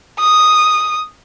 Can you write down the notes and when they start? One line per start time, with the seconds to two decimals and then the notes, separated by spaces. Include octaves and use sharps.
0.20 D#6